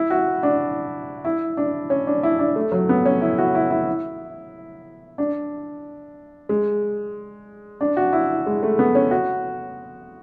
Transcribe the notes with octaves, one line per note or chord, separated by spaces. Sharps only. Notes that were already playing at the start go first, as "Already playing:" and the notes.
Already playing: E4
F#4
D4
E4
D4
C#4
D4
E4
D4
A3
F#3
B3
C#4
E4
F#4
E4
E4
D4
G#3
D4
F#4
E4
G#3
A3
B3
C#4
F#4